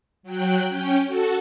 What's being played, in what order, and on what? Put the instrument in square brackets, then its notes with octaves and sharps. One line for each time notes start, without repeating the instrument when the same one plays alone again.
[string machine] F#3 G5 F#6
C#4 G5
F#4 A4